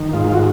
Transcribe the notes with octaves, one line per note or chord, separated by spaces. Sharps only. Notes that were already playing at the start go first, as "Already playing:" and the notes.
Already playing: D#3
G#2 F4
F#4